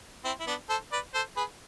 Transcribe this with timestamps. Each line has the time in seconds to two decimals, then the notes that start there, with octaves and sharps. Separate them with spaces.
0.25 C4 E4
0.40 E4
0.47 B3 D4
0.69 A4 C5
0.92 B4 D5
1.14 A4 C5
1.37 G#4 B4